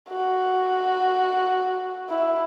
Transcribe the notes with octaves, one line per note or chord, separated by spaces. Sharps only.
F#4
E4